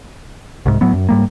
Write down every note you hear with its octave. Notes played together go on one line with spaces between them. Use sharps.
C2 G#2
A2 F#3 B3
F#2
G#2 G3 A#3